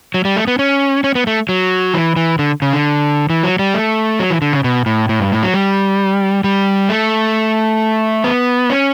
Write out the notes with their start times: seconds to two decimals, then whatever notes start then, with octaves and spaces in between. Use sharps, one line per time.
0.14 F#3
0.25 G3
0.36 A3
0.48 B3
0.59 C#4
1.04 C#4
1.15 B3
1.27 A3
1.49 F#3
1.94 E3
2.16 E3
2.39 D3
2.62 C#3
2.73 D3
3.30 E3
3.43 F#3
3.59 G3
3.74 A3
4.20 F#3
4.31 E3
4.42 D3
4.53 C#3
4.64 B2
4.86 A2
5.09 A2
5.20 G2
5.32 A2
5.43 F#3
5.54 G3
6.44 G3
6.89 A3
8.24 B3
8.70 C#4